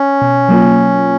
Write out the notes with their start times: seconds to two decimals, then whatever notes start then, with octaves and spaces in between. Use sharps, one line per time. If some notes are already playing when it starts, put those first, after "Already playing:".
Already playing: C#4
0.22 B2
0.49 F#3 A#3 F4